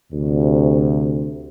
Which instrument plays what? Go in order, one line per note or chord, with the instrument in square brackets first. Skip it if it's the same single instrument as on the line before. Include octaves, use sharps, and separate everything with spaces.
[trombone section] D2 C3